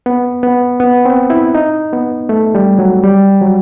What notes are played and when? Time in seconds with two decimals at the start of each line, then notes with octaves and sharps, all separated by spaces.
0.06 B3
0.43 B3
0.80 B3
1.05 C4
1.30 E4
1.55 D#4
1.93 B3
2.29 A3
2.55 G3
2.79 F#3
3.03 G3
3.42 F#3